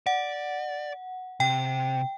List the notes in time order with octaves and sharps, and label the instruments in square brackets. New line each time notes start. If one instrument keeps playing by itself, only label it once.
[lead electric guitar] D5 [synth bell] F#5
[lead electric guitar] C3 [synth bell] G5